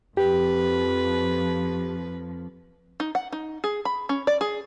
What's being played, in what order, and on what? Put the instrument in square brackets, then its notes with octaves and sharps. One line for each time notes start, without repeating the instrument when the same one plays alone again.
[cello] F2 F3 [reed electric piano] G4 [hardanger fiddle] B4
[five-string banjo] D#4
F#5
D#4
G#4
B5
C#4
D5
G#4